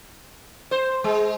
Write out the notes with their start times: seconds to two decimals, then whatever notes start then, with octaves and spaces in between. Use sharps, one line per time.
0.71 C5
1.04 G#3